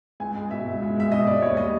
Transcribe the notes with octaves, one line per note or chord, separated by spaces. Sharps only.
C#2 G#5
G#3
B2 E5
C#2
C#2
G#3 E5
B2 D#5
C#2 D5
D#2 C#5
G3 D#5